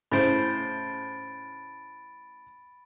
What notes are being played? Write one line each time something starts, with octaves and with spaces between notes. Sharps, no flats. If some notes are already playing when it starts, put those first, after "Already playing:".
A2 C#3 C5 B5 A6 D7